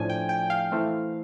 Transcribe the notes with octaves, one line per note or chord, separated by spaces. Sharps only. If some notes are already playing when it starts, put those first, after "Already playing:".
Already playing: A2 F3 A3 D4 G#5
G5
G5
F5
E3 A3 C4